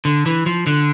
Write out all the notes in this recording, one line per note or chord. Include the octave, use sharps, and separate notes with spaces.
D3
E3
F3
D3